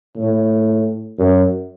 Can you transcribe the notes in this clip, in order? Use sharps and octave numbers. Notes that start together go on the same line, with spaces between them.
A2
F#2